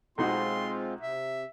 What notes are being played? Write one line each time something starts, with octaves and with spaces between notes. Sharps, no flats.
B1 G#3 C4 D#4 F4 F#4 C6
C3 E5